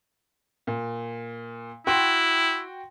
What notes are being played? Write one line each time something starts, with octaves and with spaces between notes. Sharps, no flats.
A#2
E4 F#4 G5 C6